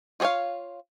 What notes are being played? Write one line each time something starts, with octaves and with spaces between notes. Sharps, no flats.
F4 F#4 G#4 C#5 F5